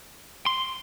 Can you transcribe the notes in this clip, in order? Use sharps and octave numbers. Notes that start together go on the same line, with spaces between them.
C6